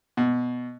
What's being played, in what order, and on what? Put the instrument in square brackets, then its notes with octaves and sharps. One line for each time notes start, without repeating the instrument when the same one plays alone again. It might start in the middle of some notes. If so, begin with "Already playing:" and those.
[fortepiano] B2